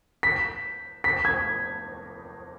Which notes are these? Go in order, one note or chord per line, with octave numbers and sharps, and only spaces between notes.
B6
B6
G#6